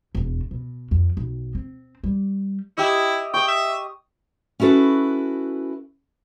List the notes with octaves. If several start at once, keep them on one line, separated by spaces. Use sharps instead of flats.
E1 E2
B2
F2
B1
C4
G3
E4 G4 D#5 E5
G5 C#6 D#6
E5
C#4 E4 F#4 A4 B4